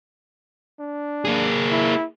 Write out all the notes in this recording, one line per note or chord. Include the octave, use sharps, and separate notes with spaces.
D4
A#3 G#4
E4